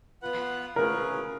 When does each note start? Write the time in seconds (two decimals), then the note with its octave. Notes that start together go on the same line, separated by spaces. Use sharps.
0.22 B3 F4 B4 F#5
0.76 C#4 F4 G#4 A#4 B4